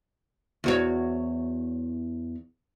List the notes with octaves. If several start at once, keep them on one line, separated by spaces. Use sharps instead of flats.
E2 F#4 C#5